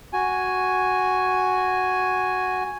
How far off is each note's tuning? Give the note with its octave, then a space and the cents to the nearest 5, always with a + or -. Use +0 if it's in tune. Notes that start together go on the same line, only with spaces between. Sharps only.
F#4 +0 G#5 +0